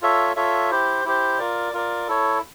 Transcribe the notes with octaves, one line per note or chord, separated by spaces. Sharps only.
F4 A4 C#5 E5
F4 A4 C#5 E5
E4 G4 C5
E4 G4 C5
F4 A#4 D5
F4 A#4 D5
E4 A4 C#5